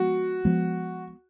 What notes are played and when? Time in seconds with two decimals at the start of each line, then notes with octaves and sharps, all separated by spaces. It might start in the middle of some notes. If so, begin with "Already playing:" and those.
Already playing: F3 G#3 B3 F#4
0.45 F3 G#3 B3